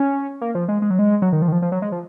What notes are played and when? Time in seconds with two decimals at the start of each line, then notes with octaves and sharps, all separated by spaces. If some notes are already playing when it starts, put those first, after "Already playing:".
Already playing: C#4
0.41 A#3
0.55 F3
0.68 G#3
0.82 G#3
0.90 F#3
0.99 G#3
1.22 F#3
1.32 D#3
1.42 F3
1.48 D#3
1.52 F3
1.62 F3
1.72 F#3
1.82 G#3
1.92 F3